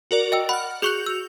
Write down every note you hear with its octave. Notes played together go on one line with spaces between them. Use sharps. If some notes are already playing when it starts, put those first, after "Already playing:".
F#4 A#4 D5
D#5 G5 E6
F#5 B5 F6
F#4 G#4 C#6 F#6 G6 F7
E6